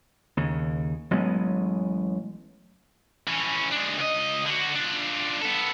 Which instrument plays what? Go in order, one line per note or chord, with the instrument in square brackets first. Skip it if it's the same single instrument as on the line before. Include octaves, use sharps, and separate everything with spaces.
[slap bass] D#2 C#3
A1 F#3 G#3 B3
[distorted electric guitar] E3 C#4
G#3 D4
C#2 D#5
D3 F#4
D4 F4
B3 A4